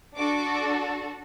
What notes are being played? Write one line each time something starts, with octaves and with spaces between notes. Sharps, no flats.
D4 F#4 A4 D6